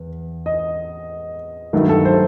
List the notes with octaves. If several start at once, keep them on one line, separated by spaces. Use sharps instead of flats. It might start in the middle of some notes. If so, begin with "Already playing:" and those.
Already playing: E2
D#5
G2 D#3 F#3 A3
A4
C5